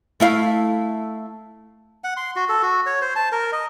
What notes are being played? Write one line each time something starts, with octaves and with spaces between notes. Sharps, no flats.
A3 E4 F5
F#5
C6
F#4
A4
F#4
C#5
C5
A5
A#4
D#5